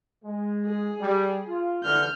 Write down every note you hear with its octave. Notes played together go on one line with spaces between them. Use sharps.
G#3
G#4
G3
F4
D2 D3 E3 F6 G6